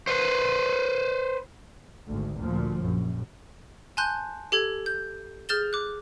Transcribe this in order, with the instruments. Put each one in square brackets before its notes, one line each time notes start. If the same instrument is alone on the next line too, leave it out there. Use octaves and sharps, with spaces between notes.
[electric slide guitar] B4 C5
[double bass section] G#1 D2
D2 A#2 F3
A#1 F#2
[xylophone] G#5 A5 C6 F#6 G6
G4 A4 G#6
G6
G#4 F6 G6 A6 E7 G7
D6 F#6